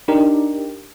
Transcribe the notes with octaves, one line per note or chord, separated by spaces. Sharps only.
D4 D#4 G4 A#4